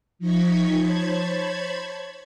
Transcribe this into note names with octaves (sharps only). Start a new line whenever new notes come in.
F3 D#4 D#5 C#6 G#6 B6
C5 C#5 A5 B5 G#6